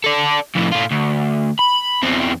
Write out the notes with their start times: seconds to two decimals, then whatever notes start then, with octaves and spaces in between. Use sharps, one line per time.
0.04 A4 D5
0.55 F2 A2
0.72 A2 F4
0.91 D2
1.59 B5
2.02 E2 C4